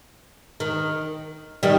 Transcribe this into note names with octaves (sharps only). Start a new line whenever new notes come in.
D#3
D#3 G3